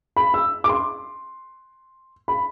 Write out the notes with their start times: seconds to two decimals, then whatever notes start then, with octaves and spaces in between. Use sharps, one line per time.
0.17 B5
0.34 E6
0.64 D6
0.69 C6
2.28 B5